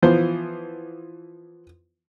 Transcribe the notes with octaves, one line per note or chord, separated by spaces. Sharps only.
E3 F3 B3 C5